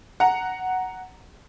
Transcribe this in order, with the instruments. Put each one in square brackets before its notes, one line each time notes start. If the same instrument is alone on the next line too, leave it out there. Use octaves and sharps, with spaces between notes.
[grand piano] F#5 A#5